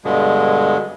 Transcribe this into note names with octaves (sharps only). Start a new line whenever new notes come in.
G2 B2 D3 G#3